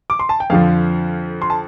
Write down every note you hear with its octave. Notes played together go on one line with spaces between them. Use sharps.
D6
C6
A5
G5
F2 D3 F3 F5
C6
A5